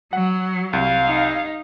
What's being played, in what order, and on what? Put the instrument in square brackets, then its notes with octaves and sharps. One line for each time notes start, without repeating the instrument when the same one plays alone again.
[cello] F#3 [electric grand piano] F#5
[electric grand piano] C2 [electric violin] F5
[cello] D#4